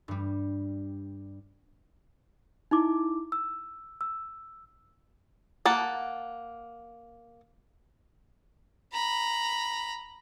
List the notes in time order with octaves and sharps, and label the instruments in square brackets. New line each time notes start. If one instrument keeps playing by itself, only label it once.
[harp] G2 G3
[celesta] D#4 E4 D6
E6
E6
[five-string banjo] A#3 F#5 A5
[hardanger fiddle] A#5 B5